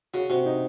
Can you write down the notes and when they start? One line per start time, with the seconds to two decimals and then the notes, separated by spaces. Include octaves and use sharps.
0.14 C#3 F#4
0.29 C3 F#4
0.46 D#4